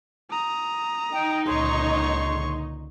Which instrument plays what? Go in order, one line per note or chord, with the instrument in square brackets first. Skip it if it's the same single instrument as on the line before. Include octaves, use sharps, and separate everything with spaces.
[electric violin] A#5 D#6
[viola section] D#4 [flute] G5
[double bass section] C#2 A#2 D3 [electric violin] C#5 C#6 [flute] C6